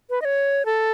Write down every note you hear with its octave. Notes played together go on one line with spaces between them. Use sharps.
B4
D#5
C#5
A4